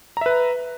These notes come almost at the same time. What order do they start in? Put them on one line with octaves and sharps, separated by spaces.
A#5 E5 B4